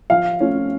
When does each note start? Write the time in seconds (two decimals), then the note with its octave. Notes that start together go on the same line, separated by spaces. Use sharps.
0.10 F3 F5
0.40 A3 C#4 F4